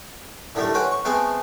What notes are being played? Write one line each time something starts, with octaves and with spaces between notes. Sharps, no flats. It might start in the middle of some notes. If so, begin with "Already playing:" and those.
A2 D3 D#3 G3 A3
C#4 F#4 B4 C5 G5
C#6
G#3 A3 B3 C4 F5 G5